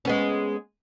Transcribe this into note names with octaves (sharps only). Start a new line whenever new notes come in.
G#3 B3 C#4